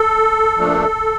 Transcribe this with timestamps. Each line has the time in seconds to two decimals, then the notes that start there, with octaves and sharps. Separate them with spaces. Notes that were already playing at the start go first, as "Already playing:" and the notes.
Already playing: A4
0.57 A#2 F3 A3 D4